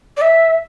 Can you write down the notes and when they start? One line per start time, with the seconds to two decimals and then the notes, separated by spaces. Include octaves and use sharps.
0.17 D5
0.21 E5